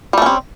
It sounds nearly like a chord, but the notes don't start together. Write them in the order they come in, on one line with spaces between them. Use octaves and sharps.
G3 A3 C#4 C4